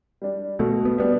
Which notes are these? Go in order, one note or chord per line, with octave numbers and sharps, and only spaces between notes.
G3 D4
B2 A3
B3
G3 B3 D4